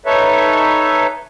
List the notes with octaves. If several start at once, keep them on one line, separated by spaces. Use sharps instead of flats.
D#4 A4 B4 C#5 E5